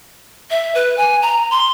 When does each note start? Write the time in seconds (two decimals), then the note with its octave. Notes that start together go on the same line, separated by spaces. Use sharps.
0.51 E5
0.75 B4
0.97 G#5
1.22 A#5
1.51 C6